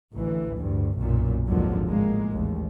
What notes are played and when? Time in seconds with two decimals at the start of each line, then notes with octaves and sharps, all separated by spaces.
0.13 A1 D2 E3
0.56 D2 G2
0.97 B1 F#2 A#2
1.47 G#1 D#2 D3 F3 F#3
1.87 A2 G#3 A#3
2.32 A1 D#2